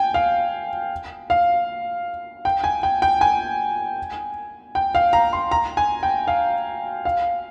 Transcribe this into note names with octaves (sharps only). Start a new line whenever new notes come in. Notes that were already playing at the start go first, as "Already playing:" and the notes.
Already playing: G5 G#5
F5
F5
G5
G#5
G5
G5
G#5
G5
F5
A#5
C6
A#5
G#5
G5
F5
F5